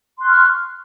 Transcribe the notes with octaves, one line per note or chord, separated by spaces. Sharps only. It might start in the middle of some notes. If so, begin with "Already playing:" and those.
C6 C#6 F6 F#6